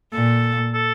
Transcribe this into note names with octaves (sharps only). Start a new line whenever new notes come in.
A#2 A4
A4